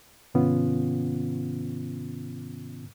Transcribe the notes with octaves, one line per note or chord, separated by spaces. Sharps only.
G#2 C3 D#3 B3 C#4 F4